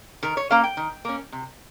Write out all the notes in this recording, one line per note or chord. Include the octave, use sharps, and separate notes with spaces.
D#3 A#4
C#5
A#3 C#4 F5
G5
D#3
A#3 C#4
C3